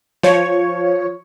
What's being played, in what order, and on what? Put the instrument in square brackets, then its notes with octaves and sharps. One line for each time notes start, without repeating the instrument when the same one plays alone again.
[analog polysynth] F3 C#5